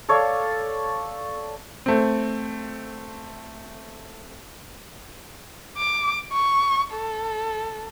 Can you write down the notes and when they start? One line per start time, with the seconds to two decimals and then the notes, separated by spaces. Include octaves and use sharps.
0.09 A4 C#5 D5 F5
1.86 A3 C4
5.77 D6
6.32 C#6
6.93 A4